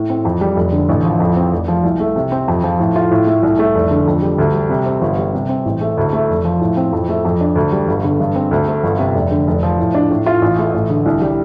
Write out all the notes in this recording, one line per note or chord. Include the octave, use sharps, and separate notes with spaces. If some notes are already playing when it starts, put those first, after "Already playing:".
Already playing: A2
C4
F2
G3
F1
D3
A1
F3
F2
C4
F1
F3
C2
A3
C3
C4
F2
F3
A2
F4
A2
A3
C2
A3
F1
D3
F2
G3
D2
G3
C3
C4
G1
G3
C3
C4
A1
A3
D2
A3
F1
F3
A2
C4
F2
A3
F2
D4
D2
G3
G1
D3
G2
C4
D2
A3
G1
C3
F1
D3
F1
F3
A2
D4
A2
F4
A1
A3
A1
D3
C2
G3